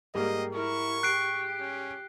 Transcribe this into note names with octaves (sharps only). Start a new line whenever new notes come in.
G#2 G3 A#3 G4 D#5
E4 A#4 C#6
G4 F#6 C7 D7
C#4